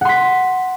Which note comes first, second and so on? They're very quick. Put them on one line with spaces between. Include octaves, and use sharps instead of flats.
F#5 C6 B6